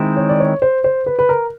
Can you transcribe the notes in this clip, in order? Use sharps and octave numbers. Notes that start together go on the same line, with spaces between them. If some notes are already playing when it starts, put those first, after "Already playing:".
Already playing: D#3 G#3 C4 E4
C#5
D5
C#5
C5
C5
B4
B4
A#4